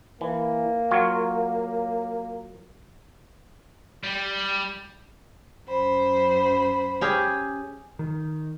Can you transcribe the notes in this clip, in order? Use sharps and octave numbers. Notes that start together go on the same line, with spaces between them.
E3 A#3
F#3 F4 C#5
G3
F#2 C5 B5
C#4 G4 G#4
D#3